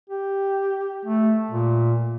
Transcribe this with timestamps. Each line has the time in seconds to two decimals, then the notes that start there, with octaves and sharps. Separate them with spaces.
0.10 G4
1.05 A3
1.51 A#2